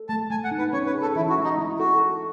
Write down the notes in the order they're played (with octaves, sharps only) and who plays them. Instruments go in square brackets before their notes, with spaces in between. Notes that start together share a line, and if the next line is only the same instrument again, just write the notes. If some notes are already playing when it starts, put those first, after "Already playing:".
Already playing: [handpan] A4
[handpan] A3 [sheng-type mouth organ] A5
[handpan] A3 [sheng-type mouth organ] G#5
[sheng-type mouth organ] F#5
[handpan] D#4
[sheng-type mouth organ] B4
[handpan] C#4 [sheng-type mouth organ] C#5
[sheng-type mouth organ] B4
[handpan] G#4
[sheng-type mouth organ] A4
[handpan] E3 [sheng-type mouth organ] E4
[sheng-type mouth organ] F#4
[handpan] G#3
[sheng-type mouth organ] D#4
[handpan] E4
[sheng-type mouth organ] F#4 [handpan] A4